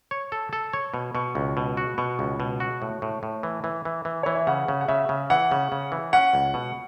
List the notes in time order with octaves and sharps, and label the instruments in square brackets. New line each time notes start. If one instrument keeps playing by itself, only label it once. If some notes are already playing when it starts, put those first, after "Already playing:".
[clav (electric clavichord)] C#5
A4
A4
C#5
B2
[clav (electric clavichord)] B2 [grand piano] C#6
[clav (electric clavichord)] C#2
B2
F#4
[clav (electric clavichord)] B2 [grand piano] C#6
[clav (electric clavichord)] C#2
B2
F#4
A2
A2
A2
E3
E3
E3
E3
[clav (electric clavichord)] E3 [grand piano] C#5
[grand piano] E5
[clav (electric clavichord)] C#3 [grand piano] F#5
[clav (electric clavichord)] C#3
[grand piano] F#5
[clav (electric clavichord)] C#3 [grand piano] E5
[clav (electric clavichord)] C#3
[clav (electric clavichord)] E3 [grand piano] F#5
[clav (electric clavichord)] C#3
C#3
E3
[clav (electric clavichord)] C#4 [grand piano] F#5
[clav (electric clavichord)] C#2
B2